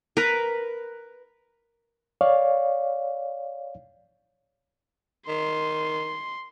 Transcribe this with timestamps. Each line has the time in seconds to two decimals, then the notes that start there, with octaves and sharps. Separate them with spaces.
0.17 A#4 B4
2.21 C#5 D5 F5
5.28 D#3 C6